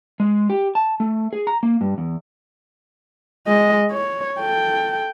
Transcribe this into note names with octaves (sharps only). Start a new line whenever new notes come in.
G#3
G4
A5
A3
G#4
A#5
A#3
G2
E2
G#3 D#5
C#5
A4 G5